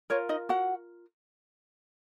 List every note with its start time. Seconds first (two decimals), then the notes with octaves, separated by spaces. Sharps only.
0.10 F4 A#4 C#5
0.29 D#4 D#5
0.49 F#4 F#5